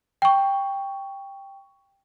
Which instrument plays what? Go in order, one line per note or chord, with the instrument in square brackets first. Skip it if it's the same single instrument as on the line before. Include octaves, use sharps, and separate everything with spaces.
[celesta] G5 C#6